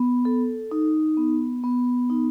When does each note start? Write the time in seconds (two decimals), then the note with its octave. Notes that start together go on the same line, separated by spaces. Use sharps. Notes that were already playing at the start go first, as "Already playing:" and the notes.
Already playing: B3
0.25 A4
0.71 D#4
1.17 B3
1.64 B3
2.10 D#4